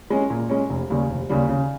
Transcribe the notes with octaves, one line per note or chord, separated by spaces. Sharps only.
G#3 C#4
A#2
G#3 C#4
F1
D#2 C#3 G3
F1
D#2 C#3 G3
C#3